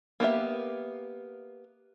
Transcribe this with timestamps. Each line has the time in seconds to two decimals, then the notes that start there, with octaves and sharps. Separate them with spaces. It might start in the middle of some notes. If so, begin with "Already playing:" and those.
0.20 A#3 B3 G4 E5